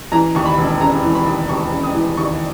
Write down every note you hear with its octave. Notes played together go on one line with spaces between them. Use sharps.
E3 A#5
D#2 C#6
B5
E1
C#3 A#5
E3
B5
D#2
E1 C#6
C#3
D#6
E3
D#2 C#6